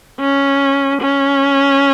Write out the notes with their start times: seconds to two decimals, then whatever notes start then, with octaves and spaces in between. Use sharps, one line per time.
0.20 C#4
1.01 C#4